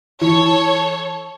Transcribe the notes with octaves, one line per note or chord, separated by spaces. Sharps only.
E3 A4 C#5